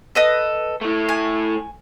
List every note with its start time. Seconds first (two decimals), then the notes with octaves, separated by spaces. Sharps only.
0.15 A4 B4 D#5
0.81 A3 E4
1.09 G#5